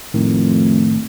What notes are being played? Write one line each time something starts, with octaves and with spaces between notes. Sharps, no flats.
F2 A2 D#3 A3